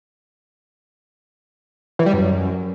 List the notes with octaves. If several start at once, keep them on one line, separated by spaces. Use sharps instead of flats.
E3
G3
F#2